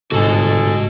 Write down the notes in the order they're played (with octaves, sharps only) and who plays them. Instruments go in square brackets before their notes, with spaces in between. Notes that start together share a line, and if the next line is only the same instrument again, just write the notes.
[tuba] G1 [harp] G#2 C3 A5 [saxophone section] G#3 A4 [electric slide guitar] F#4 D#5